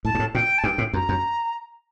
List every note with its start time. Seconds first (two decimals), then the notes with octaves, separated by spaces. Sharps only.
0.05 A2 A5
0.15 G2
0.19 A2
0.34 A#2 G5
0.58 A5
0.64 G2 G5
0.78 A2
0.93 F#2 A#5
1.09 F#2